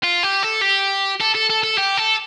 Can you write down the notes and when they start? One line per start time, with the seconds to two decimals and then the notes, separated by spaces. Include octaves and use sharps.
0.04 F4
0.23 G4
0.43 A4
0.61 G4
1.20 A4
1.35 A4
1.50 A4
1.64 A4
1.78 G4
1.98 A4